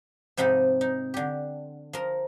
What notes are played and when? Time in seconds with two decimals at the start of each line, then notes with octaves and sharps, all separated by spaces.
0.37 G#2 C3 F3 D#4 B5
0.81 D#4
1.14 D3 G4
1.93 F3 A#4